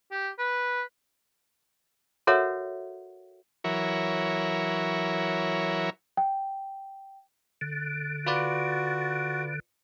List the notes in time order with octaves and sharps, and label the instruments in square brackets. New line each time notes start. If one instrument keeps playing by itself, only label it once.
[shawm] G4
B4
[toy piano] F#4 A4 A#4 C#5 E5 F#5
[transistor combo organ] E3 F#3 E4 A#4 C#5
[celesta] G5
[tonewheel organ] D3
[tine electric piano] F4 B4 D5 [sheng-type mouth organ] F#4